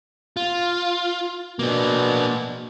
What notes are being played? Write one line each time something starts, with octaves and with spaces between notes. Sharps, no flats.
F4
B2 A#3 D4